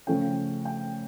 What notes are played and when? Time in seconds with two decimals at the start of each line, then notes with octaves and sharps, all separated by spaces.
0.07 C#3 F3 A3 C#4 G5
0.65 G5